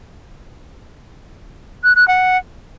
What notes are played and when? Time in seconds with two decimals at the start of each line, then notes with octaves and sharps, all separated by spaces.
1.84 F#6
1.96 F#6
2.08 F#5